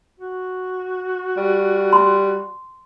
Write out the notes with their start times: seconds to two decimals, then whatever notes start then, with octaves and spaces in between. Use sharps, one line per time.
0.20 F#4
1.37 G3
1.93 C6